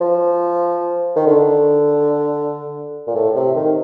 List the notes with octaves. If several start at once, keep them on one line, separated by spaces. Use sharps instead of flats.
F3
D#3
D3
A#2
A2
C3
D#3